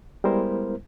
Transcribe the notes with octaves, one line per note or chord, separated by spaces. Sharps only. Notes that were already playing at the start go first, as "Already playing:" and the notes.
G3 G#3 B3 E4 A#4 C5